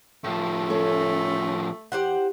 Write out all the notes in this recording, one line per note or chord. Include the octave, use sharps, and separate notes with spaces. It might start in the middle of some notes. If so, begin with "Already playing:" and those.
A2 F3 A3 A5
C#4 A4 C#5
E2 G4 C5 F#5